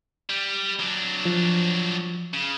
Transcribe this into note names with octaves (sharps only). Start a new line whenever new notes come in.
G3
F#3 D4
F3
C#3